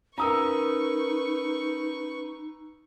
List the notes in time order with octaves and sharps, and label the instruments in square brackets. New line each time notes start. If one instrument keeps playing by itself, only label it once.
[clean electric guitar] C#4 A#4 [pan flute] D#4 [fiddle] B4 C#6 [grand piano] A#5 D#6 E6